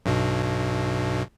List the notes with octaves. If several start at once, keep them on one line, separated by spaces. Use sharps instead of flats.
B1 G2 B2